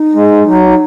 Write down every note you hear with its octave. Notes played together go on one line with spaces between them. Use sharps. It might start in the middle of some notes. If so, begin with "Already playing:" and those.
Already playing: D#4
G#3
F#3